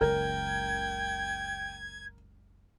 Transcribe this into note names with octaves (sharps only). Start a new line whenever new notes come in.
F#1 C#2 A#4 G5 G#6